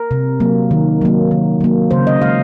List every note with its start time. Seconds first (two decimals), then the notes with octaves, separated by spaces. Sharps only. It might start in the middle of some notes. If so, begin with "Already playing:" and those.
Already playing: A#4
0.11 C3
0.40 F#3 A#3
0.71 D#3
1.01 F#3 A#3
1.31 D#3
1.61 F#3 A#3
1.91 C#3 C5
2.07 D#5
2.22 G#3 F5